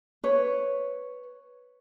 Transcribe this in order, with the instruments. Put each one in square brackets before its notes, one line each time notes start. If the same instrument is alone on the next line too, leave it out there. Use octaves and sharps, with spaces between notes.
[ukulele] B4 C#5